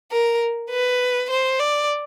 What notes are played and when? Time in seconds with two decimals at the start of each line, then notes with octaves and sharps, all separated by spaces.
0.11 A#4
0.71 B4
1.30 C5
1.60 D5